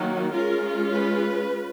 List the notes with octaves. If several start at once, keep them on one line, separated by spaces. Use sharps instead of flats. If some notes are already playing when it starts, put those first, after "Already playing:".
Already playing: D#3 F#3 A#3
G#3 C#4 F4 A#4
B4